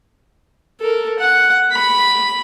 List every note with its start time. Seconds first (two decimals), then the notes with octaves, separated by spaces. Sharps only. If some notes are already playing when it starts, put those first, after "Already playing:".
0.81 A4 A#4
1.19 F#5
1.72 B5